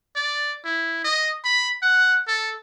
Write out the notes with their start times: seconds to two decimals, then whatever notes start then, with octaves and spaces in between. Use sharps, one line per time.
0.16 D5
0.65 E4
1.05 D#5
1.45 B5
1.82 F#5
2.28 A4